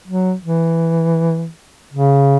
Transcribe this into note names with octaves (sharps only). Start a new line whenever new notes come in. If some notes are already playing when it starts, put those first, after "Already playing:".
F#3
E3
C#3